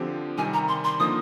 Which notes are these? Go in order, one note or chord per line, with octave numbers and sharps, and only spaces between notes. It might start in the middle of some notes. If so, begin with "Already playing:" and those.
Already playing: D3 F3 C4 G4
C3 D#3 G3 G#5
A#5
C6
C6
D3 F3 A#3 D#4 D#6